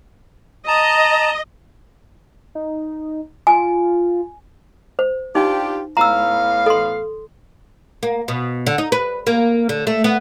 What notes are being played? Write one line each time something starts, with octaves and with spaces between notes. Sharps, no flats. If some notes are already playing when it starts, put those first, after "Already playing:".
D#5 A5 A#5
D#4
F4 G#5
C5
D4 D#4 F4 G4
A2 B3 F5 A#5 E6
A4 C6
A#3
B2
D3
D#4
B4
A#3
D3
A3
B3